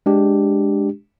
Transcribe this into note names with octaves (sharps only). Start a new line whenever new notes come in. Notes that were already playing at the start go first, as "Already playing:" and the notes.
G#3 D4 G4